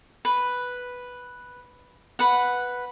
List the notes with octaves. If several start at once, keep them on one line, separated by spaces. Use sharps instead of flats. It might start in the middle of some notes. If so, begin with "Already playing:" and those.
B4
B4 F#5